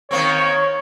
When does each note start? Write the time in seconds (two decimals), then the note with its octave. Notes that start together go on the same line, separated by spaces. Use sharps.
0.11 D#3 A#3 C4 C#5 C#6